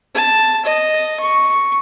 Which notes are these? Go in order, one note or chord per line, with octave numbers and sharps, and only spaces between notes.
A5
D#5
C#6